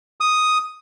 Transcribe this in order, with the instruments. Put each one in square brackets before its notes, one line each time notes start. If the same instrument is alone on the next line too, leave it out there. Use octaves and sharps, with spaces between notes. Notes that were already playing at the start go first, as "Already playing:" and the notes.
[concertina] D#6